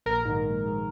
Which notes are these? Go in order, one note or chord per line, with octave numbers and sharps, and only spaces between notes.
A#1 A#4
G#2 D#3
A#1
G#2 D#3